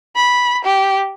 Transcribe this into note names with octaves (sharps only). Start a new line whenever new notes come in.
B5
G4